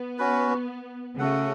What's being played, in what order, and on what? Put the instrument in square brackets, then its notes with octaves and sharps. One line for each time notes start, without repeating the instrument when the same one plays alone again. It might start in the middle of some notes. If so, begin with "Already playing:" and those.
Already playing: [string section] B3
[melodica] C#4 F#4 B4
[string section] C#3 [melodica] A3 F#4 A4 F#5